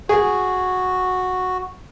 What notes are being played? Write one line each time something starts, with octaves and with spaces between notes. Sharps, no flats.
F#4 G#4